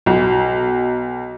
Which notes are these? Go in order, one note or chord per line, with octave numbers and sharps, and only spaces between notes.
B1